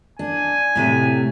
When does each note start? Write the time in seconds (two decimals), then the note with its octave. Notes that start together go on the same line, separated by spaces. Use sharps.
0.19 D4 G#5
0.76 A2 C3 A3